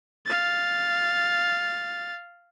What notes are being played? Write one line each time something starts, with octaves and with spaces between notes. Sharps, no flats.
F5 A6